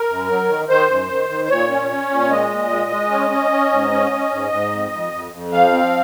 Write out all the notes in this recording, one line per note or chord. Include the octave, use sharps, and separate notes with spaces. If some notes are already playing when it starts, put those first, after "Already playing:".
Already playing: A#4
F#2
F#3
D#3
D#3 C5
F#2
D#3
D#3
C5
A#2 C#5
C#4
C#4
A#2
C#5
G#3 D#5
A#2
G#3
G#3
C#4
C#4
C#4
G#2
C#4
C#4
G#2
G#2
F2
F2
F2
F2
F3 F5
C4